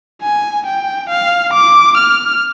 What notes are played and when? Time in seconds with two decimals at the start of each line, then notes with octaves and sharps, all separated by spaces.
0.23 G#5
0.67 G5
1.10 F5
1.53 D6
1.97 F6